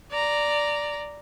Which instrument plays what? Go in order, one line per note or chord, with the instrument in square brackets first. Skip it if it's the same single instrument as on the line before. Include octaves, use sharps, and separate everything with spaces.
[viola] D5 A#5